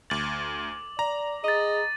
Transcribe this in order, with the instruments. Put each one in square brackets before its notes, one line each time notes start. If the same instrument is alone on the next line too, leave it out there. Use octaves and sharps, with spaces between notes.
[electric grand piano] D2 A6 [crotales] D6 F#7
[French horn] D5 [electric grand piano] A#5
[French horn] G#4 [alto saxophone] D#5 [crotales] A6 D#7